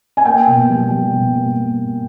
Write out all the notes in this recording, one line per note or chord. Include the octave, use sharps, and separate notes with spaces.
G#5
A#3 G5
B2
G3
G3
B2
A#3
A#3